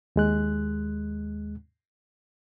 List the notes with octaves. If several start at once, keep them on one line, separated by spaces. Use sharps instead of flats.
D#2 G#3 F#6